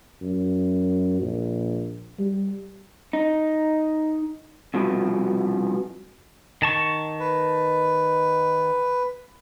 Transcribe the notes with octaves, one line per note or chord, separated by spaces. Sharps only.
F#2
A#1
G3
D#4
C2 B2 F3
D#3 A5 C#6
B4